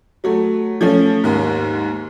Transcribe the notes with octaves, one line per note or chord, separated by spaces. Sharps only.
F#3 A3
F3 A3 C#4
D#2 G#2